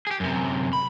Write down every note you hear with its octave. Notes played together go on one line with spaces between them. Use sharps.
G4 G#4
F#2 C3
B5